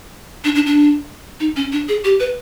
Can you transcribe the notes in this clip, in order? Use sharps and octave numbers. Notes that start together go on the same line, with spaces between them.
D4
D4
D4
D#4
C#4
D4
G#4
G4
B4